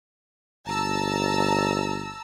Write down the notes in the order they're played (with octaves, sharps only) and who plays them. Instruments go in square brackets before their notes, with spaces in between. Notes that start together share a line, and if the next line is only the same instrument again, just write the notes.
[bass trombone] G1 [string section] A5 A#5 E6